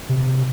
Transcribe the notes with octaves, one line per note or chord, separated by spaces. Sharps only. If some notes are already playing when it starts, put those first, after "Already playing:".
C3